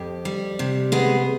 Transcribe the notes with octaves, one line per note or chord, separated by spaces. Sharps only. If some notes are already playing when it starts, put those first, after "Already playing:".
Already playing: F2 G4
G3
C3
G#3 B3 G#4